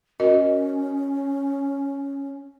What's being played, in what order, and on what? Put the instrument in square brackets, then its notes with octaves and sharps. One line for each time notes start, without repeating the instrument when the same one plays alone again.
[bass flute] C#4 [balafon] F#4 A#4 D#5